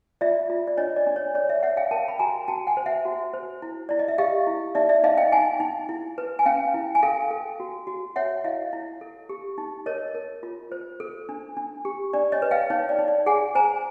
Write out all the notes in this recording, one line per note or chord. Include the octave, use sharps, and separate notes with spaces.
F4 D5 E5
F4
D5
D4 C#5 D#5
D5
D4
C#5
C#5 D5
D5 E5
C#5 E5 F#5
F5 G5
A#4 G5 A5
B5
F#4 G#5 A#5
F#4 G5 A5
F#5 G#5
C5
E5 F#5
F#4
C5
E4
E4 D5
D#5
E5
G4 D#5 F5
E4
D#4 D5 E5
D5 E5
D#4 D#5 F5
F5 G5
D#4 F#5 G#5
D#4
E4
B4
G#5
C#4 F5 G5
E4
G#5
A4 F5 G5
A4
F#4
F#4
C#5 E5 F#5
E4 D#5 F5
E4
A4
G4
D#4
A#4 C#5 D#5
A#4
F4
C5
A4
D4
D4
G4
D4 D5
C#5 D#5
B4
F5 G5
D#4 C#5
D5
D#4
D5
G#4 F#5 G#5
C5 G#5 A#5